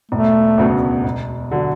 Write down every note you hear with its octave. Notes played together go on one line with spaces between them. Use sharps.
E1 A3
D2 C#3 F#3 B3
E1
D3 F#3